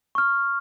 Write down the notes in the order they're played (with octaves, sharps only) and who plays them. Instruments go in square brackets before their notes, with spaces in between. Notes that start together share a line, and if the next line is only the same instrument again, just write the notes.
[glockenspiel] C#6 F6